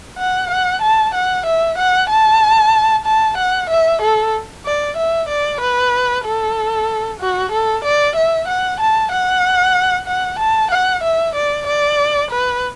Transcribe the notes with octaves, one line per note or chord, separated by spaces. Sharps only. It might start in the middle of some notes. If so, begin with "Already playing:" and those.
F#5
F#5
A5
F#5
E5
F#5
A5
A5
F#5
E5
A4
D5
E5
D5
B4
A4
F#4
A4
D5
E5
F#5
A5
F#5
F#5
A5
F#5
E5
D5
D5
B4